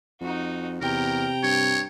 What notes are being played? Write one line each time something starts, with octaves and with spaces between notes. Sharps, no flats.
F2 D#4 F#4
E2 C3 A#4 G5 A#5
G2 C#5